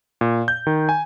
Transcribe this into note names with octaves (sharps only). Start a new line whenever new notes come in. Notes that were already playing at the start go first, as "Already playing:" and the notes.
A#2
G6
D#3
G#5